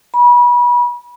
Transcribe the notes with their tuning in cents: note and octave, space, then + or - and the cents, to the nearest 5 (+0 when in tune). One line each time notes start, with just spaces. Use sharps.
B5 -30